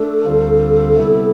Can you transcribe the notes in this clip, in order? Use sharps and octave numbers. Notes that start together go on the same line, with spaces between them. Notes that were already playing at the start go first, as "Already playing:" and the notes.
Already playing: A3 D4 A4
D2 D3 G3 C4 F4
C3 G3 B3 E4